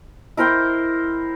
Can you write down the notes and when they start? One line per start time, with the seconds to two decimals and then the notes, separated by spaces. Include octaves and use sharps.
0.37 E4 A#4 C5 G5